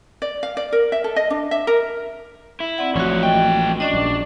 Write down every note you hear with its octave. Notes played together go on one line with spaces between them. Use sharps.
D5
F5
D5
A#4
E5
A4
D#5
D4
E5
A#4
E4
C4 D5 F#5
A1 E2 F3 F4 F#4 C#5
G#2 E3 F#4 D#5 G5
C#4 D4 D5 D#5
A#1